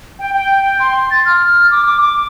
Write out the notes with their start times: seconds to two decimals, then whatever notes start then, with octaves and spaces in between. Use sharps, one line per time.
0.19 G5
0.35 G5
0.80 C6
1.11 A6
1.26 F6
1.71 D6
1.86 D6
2.01 D6